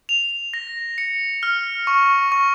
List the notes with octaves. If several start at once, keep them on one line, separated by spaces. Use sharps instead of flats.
F7
A#6
C#7
F6
C#6
C#6